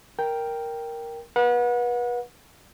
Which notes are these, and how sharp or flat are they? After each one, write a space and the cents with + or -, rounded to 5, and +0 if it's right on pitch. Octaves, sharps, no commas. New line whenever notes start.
A#4 +0 G5 +0
B4 -30 F#5 -30